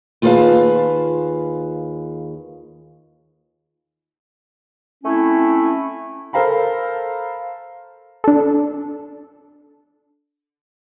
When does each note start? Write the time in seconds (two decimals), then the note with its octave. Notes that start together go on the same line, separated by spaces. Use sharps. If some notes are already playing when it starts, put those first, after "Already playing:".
0.22 D#2 F4 G#4 B4 F5 A5
5.04 A3 C4 C#4 E4
6.33 A4 A#4 C5 F5 A#5 B5
8.24 D4 A4